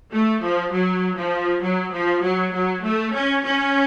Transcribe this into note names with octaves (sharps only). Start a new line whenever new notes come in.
A3
F3
F#3
F3
F#3
F3
F#3
F#3
A3
C#4
C#4